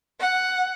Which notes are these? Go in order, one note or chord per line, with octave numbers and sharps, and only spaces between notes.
F#5